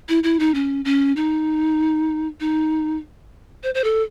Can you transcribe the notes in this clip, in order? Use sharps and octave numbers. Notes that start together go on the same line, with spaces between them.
E4
E4
D#4
C#4
C#4
D#4
D#4
C5
C5
A4